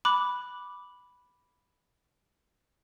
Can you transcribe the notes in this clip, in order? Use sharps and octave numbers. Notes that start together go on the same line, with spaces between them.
B5 D6 F#6